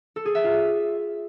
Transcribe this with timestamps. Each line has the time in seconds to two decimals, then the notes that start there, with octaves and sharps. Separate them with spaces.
0.16 A4
0.25 G#4
0.35 E5
0.44 F4